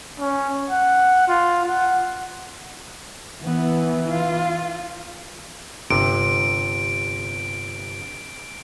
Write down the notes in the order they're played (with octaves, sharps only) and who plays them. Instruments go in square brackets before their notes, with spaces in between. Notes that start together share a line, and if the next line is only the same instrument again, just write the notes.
[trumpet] C#4
F#5
F4
F#5
[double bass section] E3 [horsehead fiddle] B3
[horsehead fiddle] F4
[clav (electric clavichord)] G1 C3 [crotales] D7